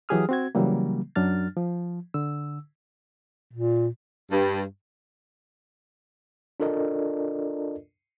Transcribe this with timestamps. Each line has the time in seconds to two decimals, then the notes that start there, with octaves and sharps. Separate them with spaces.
0.09 E3 F#3 G4 G#4 D#6 F6
0.29 C4 F#4 G#6
0.55 C#3 E3 F#3 G3 A#3
1.15 F#2 F#3 D4 F6 A6
1.57 F3
2.14 D3 E6
3.53 A#2
4.31 G2
6.60 D4 F4 A4 A#4 D5 D#5